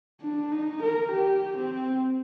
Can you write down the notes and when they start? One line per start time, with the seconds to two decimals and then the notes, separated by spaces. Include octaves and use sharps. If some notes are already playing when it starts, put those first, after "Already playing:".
0.21 D4
0.52 D#4
0.83 A#4
1.12 G4
1.58 C4